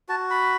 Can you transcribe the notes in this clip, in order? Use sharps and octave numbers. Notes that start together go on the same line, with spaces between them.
F#4 A5
B5